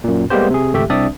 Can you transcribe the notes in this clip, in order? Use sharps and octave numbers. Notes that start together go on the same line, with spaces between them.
F#2 A#2
G3 G#3 A#3 B3 G4 C5
C3 G#4
G#1 C#2 A3 G4 E5
C2 C4 D4 D5 E5 D#6